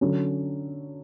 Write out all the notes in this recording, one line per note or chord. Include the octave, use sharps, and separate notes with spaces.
D3 F#3 C#4